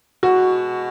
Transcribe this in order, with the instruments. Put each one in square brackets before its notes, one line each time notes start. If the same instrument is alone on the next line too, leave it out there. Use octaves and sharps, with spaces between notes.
[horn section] B2 G#3 [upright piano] F#4